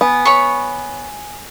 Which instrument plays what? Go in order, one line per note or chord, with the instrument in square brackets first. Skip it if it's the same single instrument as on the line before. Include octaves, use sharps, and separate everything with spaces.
[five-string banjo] B3 [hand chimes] G#5
[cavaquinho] C#5 B5 C#6